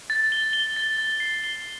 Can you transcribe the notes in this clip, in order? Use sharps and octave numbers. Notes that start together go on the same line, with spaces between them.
A6
G7
G7
A6
A6
C7
G7